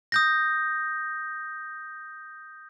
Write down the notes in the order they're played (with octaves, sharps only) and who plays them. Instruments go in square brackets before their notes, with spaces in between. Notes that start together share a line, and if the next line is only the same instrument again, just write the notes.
[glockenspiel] D#6 G6 A#6